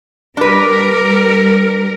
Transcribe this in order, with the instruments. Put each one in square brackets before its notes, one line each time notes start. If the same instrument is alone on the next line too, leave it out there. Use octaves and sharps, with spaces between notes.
[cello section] G3 A#4 [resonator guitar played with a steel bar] D4 B4